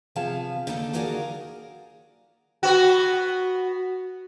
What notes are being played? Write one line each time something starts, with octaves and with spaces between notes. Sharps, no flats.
C3 F3 B3 G#4 F5 A5
D3 A#3 D#4 A4 A5
D#4 F#4 G#4 A#4 D5 F5
B3 F#4